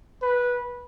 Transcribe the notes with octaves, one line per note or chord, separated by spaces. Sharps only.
B4